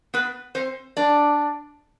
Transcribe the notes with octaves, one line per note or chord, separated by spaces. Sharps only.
B3 B4
C4 C5
D4 D5